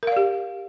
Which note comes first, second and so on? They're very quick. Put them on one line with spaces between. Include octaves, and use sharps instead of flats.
A#4 F5 D5 G4